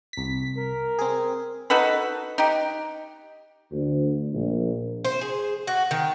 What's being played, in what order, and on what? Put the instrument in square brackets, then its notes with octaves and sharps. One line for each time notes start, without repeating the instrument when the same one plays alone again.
[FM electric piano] C2 B6
[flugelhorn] A#4
[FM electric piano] C4 G#4
[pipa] D#4 F#4 A4 B4
D#4 G4
[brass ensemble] D2
A#1
[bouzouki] C5
G#4
F#4
D#3